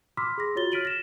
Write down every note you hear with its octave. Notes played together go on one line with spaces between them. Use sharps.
B5 C6 D6 E6 F6 B6
G#4 C6 A#6
F4 F#4 C#5 A6 G7
F6 A6 B6 D7 D#7 F#7
A#6 E7